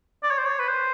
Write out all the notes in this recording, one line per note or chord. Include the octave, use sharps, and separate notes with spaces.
D5
C#5
C5
C#5
B4
C5